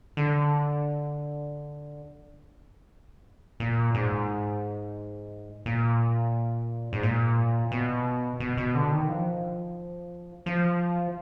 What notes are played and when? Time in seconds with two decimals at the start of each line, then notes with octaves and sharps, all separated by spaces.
0.17 D3
3.60 A#2
3.95 G#2
5.66 A#2
6.93 G#2
7.03 A#2
7.72 B2
8.40 B2
8.57 B2
8.75 D3
8.92 D#3
9.09 F3
10.46 F3